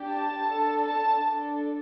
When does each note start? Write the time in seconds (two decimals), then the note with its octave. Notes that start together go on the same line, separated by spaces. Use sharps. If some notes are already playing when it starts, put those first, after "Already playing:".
Already playing: D4 G4
0.09 A5
0.47 D4 A4
0.85 A5
1.22 D4 A4